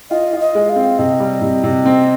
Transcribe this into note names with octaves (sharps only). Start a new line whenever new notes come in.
F4 D#5
F4
D#5
G#3
F5
C4
C3 D#5
G3
C3
C3
C4